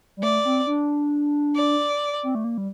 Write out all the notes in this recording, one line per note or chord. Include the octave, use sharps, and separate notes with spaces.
G3
A3 D5
C4
D4
D5
C4
A3
A#3
G3